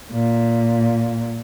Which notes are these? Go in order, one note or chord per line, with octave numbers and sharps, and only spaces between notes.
A#2